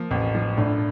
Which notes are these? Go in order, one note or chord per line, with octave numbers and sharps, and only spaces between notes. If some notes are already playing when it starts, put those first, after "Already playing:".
Already playing: F3 A#3
A1
F3
A2 D4